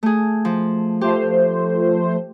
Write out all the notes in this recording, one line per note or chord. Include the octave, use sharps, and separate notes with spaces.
A3 G#4
F3
F3 A3 G4 C5